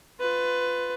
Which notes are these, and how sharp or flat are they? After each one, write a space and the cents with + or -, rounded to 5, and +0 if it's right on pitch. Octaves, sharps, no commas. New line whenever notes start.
F4 +10 B4 +20